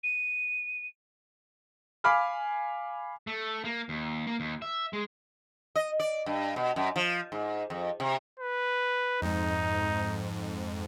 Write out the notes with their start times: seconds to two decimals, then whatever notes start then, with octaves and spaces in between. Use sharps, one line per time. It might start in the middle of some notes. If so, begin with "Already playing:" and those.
0.03 D#7
2.04 F5 G#5 B5 D6 F6
3.27 A3
3.65 A#3
3.89 D#2
4.27 A#3
4.40 D#2
4.62 E5
4.93 G#3
5.76 D#5
6.00 D5
6.26 G2
6.56 B2
6.76 F#2
6.96 F3
7.32 G#2
7.70 F2
8.00 C3
8.40 B4
9.22 F2 G#2 D#4